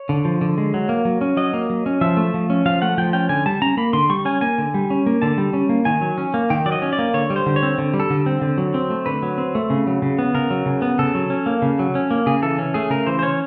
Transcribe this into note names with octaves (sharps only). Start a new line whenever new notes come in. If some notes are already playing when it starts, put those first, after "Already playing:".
Already playing: C#5
D3
F3
D3
G#3
F#3
A#3
F#3
C#4
F#3 D#5
A#3
F#3
C#4
F3 E5
A3
F3
C#4
F3 F5
A3 F#5
F3 G5
C#4 G5
D3 G#5
G3 A5
C#4 A#5
A#3 B5
D3 C6
G3 C#6
C#4 G#5
A#3 G#5
D3
G3
C#4
A#3
D3 A5
G3
C#4
A#3
D#3 G#5
F#3
C#4
A#3
D#3 G5
F#3 D5
D#5
C#4
D5
A#3
D3 C#5
G3
C5
D3
C#5
C4
D3
G3
A4
D3
C4
D3
F#3
C4
A3
D3 B4
F#3
C4
A3
C#3
F#3
C#3
B3
C#3 A#4
F#3
C#3
B3
C#3 A4
F#3
C#4
A#3
C#3
F#3
C#4
A#3
C#3 G#4
E3 A4
C#4
A3 G#4
C#3 A#4
E3 C5
C5
C#4 C#5